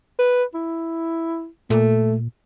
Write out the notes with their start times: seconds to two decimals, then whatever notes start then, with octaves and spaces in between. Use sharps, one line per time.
0.19 B4
0.54 E4
1.70 A#2 A3